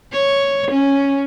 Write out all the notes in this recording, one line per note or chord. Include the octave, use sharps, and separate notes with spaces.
C#5
C#4